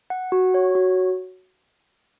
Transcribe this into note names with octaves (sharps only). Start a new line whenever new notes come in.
F#5
F#4
C#5
F#4